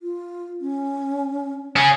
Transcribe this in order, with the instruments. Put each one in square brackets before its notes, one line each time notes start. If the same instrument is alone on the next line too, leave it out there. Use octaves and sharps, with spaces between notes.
[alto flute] F4
C#4
[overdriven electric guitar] C#4 G#4